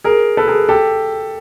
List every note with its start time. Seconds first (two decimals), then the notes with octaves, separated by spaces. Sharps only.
0.04 G#4 A#4
0.37 A4 B4
0.48 G#4 A#4
0.69 G4 A4